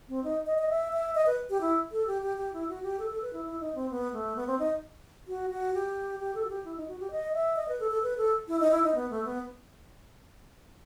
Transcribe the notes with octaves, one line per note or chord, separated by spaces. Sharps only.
C4
D#4
D#5
D#5
E5
E5
D#5
B4
G4
E4
A4
G4
G4
G4
E4
F#4
G4
A4
A4
B4
E4
E4
D#4
C4
B3
A3
B3
C4
D#4
F#4
F#4
G4
G4
A4
F#4
G4
E4
D#4
F#4
G4
D#5
E5
D#5
B4
A4
A4
B4
A4
E4
D#4
E4
D#4
B3
A3
B3